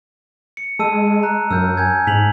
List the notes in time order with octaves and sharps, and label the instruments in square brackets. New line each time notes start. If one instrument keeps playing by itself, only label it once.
[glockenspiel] C#7
[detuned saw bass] G#3 [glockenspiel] A5 E6 D#7
[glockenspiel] A#5 F#6
[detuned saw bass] F#2 [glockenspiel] E6 F6 G6
[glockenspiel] G#5 G6 G#6
[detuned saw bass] G#2 [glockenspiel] B6 F7 F#7